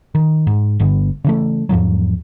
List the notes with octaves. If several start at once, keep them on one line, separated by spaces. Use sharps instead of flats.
D#3
G#2
G1 G2 D3 B3
C#3 E3 A3
E2 G#2 F3 F#3